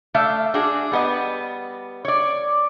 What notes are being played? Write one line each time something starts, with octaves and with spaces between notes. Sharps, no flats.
A3 D5 E5 F5
D4 F#4 G#4
G3 B3 D#5
C#5 D5